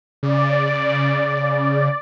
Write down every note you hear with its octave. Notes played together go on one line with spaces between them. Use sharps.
C#3 D5